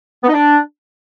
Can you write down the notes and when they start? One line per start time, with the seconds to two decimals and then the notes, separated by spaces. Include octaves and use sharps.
0.23 B3
0.28 D#4
0.33 D4